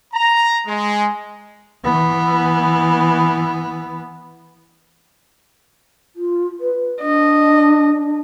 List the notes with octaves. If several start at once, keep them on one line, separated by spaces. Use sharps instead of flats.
A#5
G#3
E3 B3
F4
B4
D4 D#5